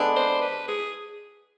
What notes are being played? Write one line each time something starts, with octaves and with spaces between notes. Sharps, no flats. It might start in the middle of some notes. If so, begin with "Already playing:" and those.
Already playing: D3 G#3 B3 D4
C5
B4
G#4